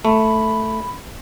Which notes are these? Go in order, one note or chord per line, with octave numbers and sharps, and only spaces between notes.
A3 B5